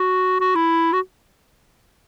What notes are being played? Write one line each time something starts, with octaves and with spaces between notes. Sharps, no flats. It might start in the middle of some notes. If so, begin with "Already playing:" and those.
Already playing: F#4
F#4
E4
F#4